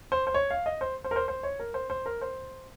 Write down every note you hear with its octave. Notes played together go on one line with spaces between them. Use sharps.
C5
C5
C#5
F5
D#5
C5
C5
A#4
C5
C5
C#5
A#4
C5
C5
A#4
C5